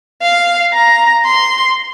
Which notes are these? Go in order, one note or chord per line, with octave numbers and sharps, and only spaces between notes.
F5
A#5
C6